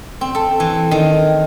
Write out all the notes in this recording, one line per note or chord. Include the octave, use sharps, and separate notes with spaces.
C4
A4
E3
D#3